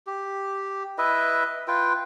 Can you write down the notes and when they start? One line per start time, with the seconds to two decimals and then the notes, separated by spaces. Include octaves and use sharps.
0.07 G4
0.98 E4 B4 D#5 E5
1.68 F4 B4 G5